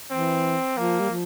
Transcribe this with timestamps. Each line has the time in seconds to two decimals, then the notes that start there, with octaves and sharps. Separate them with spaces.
0.10 E3 C4
0.77 F3 A#3
1.00 G3
1.10 F3